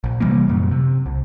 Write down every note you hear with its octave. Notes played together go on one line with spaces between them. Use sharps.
A#1
C3 E3 G3 A#3
F#2 A#2
C3
C2